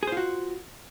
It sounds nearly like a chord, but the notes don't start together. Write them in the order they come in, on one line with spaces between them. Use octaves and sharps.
G#4 C5 F4 F#4